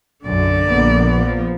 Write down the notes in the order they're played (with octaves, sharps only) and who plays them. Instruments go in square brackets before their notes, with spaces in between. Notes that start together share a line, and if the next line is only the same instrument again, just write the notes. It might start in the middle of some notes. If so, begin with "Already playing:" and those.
[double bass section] B1 F#2 [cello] D3 D5
[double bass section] A#1 A#3 B3
[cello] F3